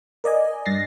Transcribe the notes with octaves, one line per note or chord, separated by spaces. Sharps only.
A#4 D5 D#5 G#5
G2 A6 A#6 C7